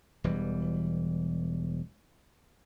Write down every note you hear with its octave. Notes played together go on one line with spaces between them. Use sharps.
E1 E3 G3